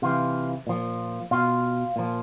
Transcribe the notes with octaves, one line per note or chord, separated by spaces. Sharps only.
C3 E3 F4
A#2 F3
B2 F4
A#2 F3